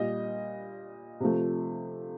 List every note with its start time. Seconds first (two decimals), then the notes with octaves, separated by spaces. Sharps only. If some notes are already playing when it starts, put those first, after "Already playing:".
Already playing: A#2 G3 D#5
1.20 C3 F3 A3